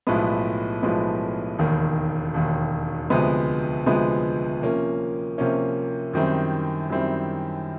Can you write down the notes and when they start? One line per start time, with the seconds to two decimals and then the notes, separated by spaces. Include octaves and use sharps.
0.07 B1 A2 F3 G#3 B3
0.83 B1 A2 F3 G#3 B3
1.59 E1 D#2 D#3
2.34 E1 D#2 D#3
3.10 D2 C3 F3 G#3 B3
3.86 D2 C3 F3 G#3 B3
4.62 C3 F3 A#3 C#4
5.38 C3 F3 A#3 C#4
6.13 F#2 D#3 G3 C4 E4
6.90 F#2 D#3 G3 C4 E4